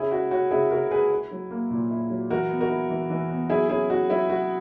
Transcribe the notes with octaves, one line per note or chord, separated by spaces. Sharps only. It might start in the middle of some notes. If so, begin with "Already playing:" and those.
Already playing: C#3 C#4 E4 G#4
G#3 F#4
C#4 F#4
C#3 E4 G#4
C#3 F#4 A#4
G#3 G#4 B4
E4
F#3
A#3
A#2
E4
F#3
E3 F#4 A#4
B3
F#4 A#4
E4
E3
E3
B3
F#3 E4 G#4
C#4 E4 G#4
E4 F#4
F#3 E4
F#3 F#4